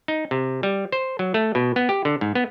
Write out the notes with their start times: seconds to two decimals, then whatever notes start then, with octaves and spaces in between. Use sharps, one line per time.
0.08 D#4
0.31 C3
0.63 G3
0.92 C5
1.19 F#3
1.34 A3
1.55 B2
1.76 B3
1.89 G4
2.05 D3
2.21 G#2
2.35 B3